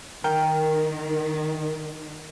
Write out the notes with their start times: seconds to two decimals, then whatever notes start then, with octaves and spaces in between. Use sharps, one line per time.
0.24 D#3 A#4 G5